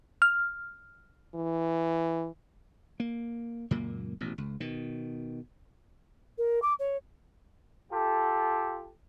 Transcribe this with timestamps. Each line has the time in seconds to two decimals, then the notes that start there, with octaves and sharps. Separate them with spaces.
0.22 F6
1.35 E3
3.00 A#3
3.71 C#2 F#2 A#2 A#3
4.21 A1 B2
4.38 C#2
4.60 B2 D#3
6.38 A#4
6.62 D6
6.79 C#5
7.92 F4 G4 A4